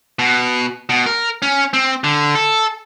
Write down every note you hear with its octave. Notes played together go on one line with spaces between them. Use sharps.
B2
B2
A#4
C#4
C4
D3
A4